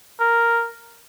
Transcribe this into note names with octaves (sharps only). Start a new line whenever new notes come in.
A#4